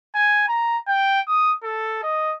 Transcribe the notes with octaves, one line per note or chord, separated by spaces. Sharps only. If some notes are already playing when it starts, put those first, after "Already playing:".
G#5
A#5
G5
D#6
A4
D#5